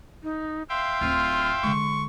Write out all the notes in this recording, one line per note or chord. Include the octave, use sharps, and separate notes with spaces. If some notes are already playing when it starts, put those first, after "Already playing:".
D#4
E5 F5 G5 C6
D1 C4 F4
D3 G#3 C#6